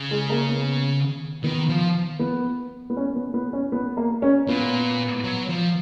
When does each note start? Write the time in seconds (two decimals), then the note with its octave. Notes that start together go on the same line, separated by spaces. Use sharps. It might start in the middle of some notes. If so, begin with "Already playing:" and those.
Already playing: C#3
0.11 G#3
0.30 A#3
0.49 B3
1.44 D#3 B3
1.69 F3
2.19 B3
2.90 B3
2.97 C#4
3.16 B3
3.34 B3
3.53 C#4
3.72 B3
3.97 A#3
4.22 C#4
4.48 A#2 B3
5.24 F#3
5.49 F3